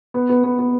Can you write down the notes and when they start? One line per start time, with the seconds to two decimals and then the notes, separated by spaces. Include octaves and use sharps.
0.14 B3
0.29 B3
0.44 B3
0.59 B3